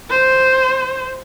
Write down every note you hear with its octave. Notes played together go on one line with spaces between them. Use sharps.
C5